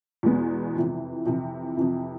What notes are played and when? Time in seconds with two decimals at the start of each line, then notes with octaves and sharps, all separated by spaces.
0.23 E2 B2 G#3 B3
0.75 F2 C3 E3
1.25 F2 C3 E3
1.77 F2 C3 E3